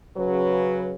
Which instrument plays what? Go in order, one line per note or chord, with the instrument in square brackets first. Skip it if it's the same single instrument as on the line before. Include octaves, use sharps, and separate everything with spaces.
[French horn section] C#3 F#3 B4